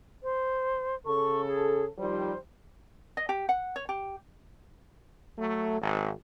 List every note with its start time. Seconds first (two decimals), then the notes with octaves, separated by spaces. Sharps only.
0.23 C5
1.06 C#3 A4 C#6
1.47 G#4
1.98 D#3 F3 G3 C5
3.17 D#5
3.29 G4
3.49 F#5
3.76 C#5
3.89 G4
5.37 F#3 A3
5.81 G#1